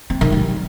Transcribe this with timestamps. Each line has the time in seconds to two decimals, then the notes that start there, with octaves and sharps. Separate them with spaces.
0.10 C4
0.21 D#3
0.32 G3